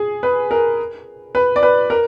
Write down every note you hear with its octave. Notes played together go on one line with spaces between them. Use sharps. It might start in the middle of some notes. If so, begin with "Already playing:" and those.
Already playing: G#4
B4
A#4
B4
D5
B4
A#4